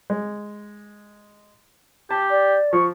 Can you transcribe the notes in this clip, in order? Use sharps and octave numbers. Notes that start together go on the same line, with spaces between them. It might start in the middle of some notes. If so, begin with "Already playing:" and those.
G#3
G4 A5
D5
F3 C#6